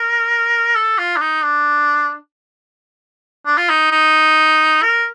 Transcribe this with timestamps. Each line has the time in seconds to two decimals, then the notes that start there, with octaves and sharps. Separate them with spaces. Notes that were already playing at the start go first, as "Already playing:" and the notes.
Already playing: A#4
0.76 A4
0.98 F4
1.17 D4
1.21 D#4
1.44 D4
3.46 D4
3.58 F4
3.69 D#4
3.92 D#4
4.82 A#4